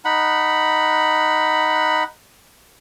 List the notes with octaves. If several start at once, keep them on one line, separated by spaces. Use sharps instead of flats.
D#4 F#5 B5